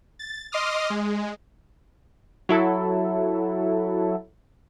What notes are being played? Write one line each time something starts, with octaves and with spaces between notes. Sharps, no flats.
A6
D#5 C6 D6 D#6 F6
G#3
F#3 E4 A4